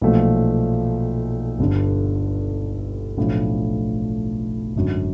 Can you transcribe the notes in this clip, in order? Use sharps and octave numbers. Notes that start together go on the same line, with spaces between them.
B1 A#2 F3 A3
G1 G2 D3
B1 A2 F3 A3 D4
G#1 F#2 D3